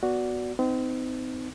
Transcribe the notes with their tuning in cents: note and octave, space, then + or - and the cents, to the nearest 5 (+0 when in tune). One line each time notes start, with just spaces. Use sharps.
B3 +0 F#4 +0 D5 -15
C4 -35 D#4 +0